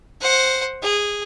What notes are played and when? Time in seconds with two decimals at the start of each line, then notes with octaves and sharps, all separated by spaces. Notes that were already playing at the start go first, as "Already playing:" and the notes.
0.21 C5 F#5
0.83 G#4